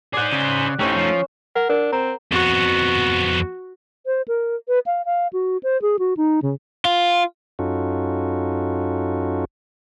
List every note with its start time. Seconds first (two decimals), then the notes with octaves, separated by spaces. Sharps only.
0.13 G#4 C5 D5 F#5
0.33 C#3
0.79 A3 C#4 D#4 E4 G4 C5
0.96 F3
1.55 A#4 F#5
1.69 D4 A#4
1.92 C4 A#5
2.32 F2 B3 F#4
4.06 C5
4.28 A#4
4.68 B4
4.86 F5
5.05 F5
5.33 F#4
5.63 C5
5.82 G#4
5.99 F#4
6.17 D#4
6.42 C#3
6.85 F4
7.59 F#2 C#4 D#4 F4 F#4 A4